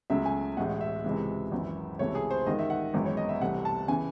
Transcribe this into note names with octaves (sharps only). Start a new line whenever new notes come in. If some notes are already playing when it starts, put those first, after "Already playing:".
C#2 C#3 F#3 A3 E5
G#5
A1 A2 G#3 F#5
E5
C#2 C3 E3 G#3
G#1 F#2 E3
C#2 C3 E3 A3 C#5
G#4
C5
A1 G#2 D#3 D#5
E5
F#5
G#1 F#2 E3 G#3
C#5
D#5
E5
C2 C3 E3 A3 F#5
A5
C#3 E3 G#5